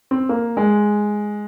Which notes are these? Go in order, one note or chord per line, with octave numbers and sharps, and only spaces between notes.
C4
A#3
G#3